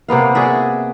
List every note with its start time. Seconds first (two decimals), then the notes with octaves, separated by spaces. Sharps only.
0.09 C3 A#3 B3 F5
0.35 F#4 G#4 D5 E5